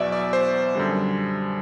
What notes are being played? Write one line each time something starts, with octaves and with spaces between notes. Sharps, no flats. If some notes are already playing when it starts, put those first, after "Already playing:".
Already playing: E2 B2 F#3 D5 E5
D5
C5
F#2 D3 G3